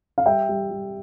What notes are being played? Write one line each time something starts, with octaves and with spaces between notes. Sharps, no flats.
F5
G3 E5 G5
G3
G3